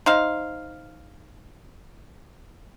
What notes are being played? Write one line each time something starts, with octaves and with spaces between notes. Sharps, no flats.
D#4 C5 F5